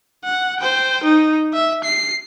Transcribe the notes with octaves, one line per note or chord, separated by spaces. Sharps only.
F#5
C5 G5
D#4
E5
C7